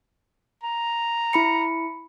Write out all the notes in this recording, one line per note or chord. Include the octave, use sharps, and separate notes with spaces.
A#5
E4 B5 C#7